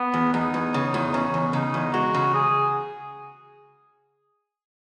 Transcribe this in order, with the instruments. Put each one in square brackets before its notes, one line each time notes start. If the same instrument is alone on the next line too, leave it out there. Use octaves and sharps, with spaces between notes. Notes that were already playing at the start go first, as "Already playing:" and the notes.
Already playing: [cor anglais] B3
[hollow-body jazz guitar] E2
[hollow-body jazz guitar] E2 [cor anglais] D#4
[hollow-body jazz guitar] E2
C#3
E2
[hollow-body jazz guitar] C#3 [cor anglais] C#4
[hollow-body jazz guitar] E2
[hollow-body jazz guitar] C#3 [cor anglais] D#4
[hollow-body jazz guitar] E2
[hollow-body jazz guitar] G#3 [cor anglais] F#4
[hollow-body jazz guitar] C#3
[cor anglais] G#4